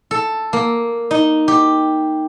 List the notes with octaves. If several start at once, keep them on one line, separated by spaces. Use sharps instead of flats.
A4
A#3
D#4
G4